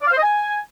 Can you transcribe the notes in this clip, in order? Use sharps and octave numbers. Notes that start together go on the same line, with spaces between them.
D5
F5
C5
D#5
G#5